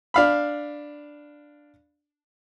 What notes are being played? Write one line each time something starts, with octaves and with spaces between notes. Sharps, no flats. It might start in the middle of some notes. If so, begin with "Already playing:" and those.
D4 F5 B5